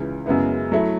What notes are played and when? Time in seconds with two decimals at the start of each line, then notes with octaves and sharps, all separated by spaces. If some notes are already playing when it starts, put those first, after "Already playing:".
Already playing: C#2 C#3 E3
0.26 F#2 C#3 G#3 B3 E4
0.72 F#3 A3 E4